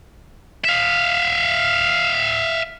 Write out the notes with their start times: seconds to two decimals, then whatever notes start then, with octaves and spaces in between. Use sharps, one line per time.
0.64 E5 F5